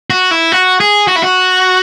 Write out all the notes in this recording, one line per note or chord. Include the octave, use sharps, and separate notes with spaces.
F#4
E4
F#4
G#4
F#4
E4
F#4